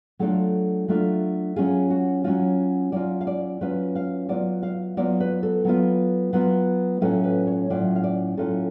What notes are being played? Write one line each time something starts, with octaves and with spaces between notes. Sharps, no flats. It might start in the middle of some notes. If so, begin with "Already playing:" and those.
F#3 A3 D4 F4 A4
F#3 A3 D4 F4
F#3 C#4 F4 G#4
F#4
F#3 C#4 F4 F#4
F#3 C#4 F4 D5
F5
D5
F#3 C#4 F4 B4
F5
F#3 B3 F4 D5
F5
F#3 B3 F4 D5
B4
A4
F#3 B3 F4
F#3 B3 F4
A2 F#3 C#4 F4 A4
B4
C#5
A2 F#3 C#4 F4 D5
F5
D5
A2 F#3 C#4 F4 A4